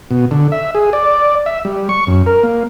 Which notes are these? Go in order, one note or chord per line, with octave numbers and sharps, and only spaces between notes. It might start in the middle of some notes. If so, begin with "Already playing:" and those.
B2
D3
E5
G#4
D5
E5
G3
C#6
F#2
A#4
A#3